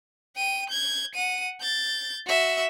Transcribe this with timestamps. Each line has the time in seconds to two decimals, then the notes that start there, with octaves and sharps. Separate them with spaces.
0.36 G5 D#7
0.69 G6 G#6
1.15 F#5 D#7
1.61 G6 A6
2.27 F#4 E5